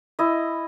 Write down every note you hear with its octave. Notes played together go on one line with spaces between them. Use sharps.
E4 D#5